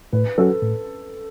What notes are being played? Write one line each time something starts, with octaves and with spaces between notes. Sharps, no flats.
A2 B4
F#3 C#4 F#4 A4
A2